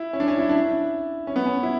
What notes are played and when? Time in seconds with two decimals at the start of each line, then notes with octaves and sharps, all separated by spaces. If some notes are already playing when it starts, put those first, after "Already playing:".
Already playing: E4
0.13 C#4
0.20 D4
0.28 C#4
0.38 E4
0.49 D4
0.55 E4
1.27 C#4
1.36 B3
1.46 C#4
1.63 E4